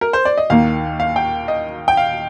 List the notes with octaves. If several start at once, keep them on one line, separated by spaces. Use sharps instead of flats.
A#4
C5
D5
D#5
D#2 D#3 A#3 F5
F5
G5
D#5
G5
F5